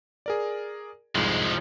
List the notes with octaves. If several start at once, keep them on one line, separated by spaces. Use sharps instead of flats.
G#4 A#4 D5
C2 F2 G#2 F3 G#3